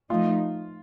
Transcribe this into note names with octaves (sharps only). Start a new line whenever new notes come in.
F3 A3 D#4 F4